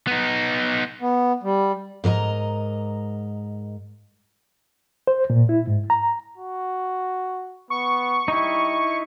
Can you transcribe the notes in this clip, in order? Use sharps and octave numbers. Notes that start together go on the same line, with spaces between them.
B3 D#4
B3
G3
G#2 A#4 D#5 A#5
C5
A#2
E4
G#2
A#5
F#4
B3 C#6
G3 D#4 E4